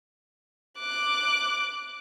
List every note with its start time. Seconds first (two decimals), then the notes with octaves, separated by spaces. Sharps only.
0.79 D6 F#6